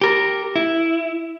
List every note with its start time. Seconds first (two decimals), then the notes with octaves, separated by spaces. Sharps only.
0.01 G4 A#4
0.56 E4